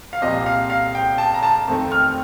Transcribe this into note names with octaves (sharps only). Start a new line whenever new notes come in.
F5
C2 A#2 F3 C4 D#5
F5
F5
G5
A5
A#5
A5
F2 D#3 A3 C4
F6